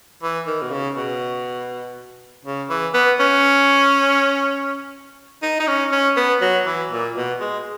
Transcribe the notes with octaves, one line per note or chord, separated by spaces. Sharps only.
E3
D#3
B2
C#3
B2
C#3
E3
B3
C#4
D#4
D#4
C#4
C#4
B3
F#3
E3
A#2
B2
G#3